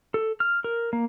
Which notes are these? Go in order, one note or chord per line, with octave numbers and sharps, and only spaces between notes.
A4
F6
A#4
A#3